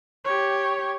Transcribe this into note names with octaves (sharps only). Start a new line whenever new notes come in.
G4 C#5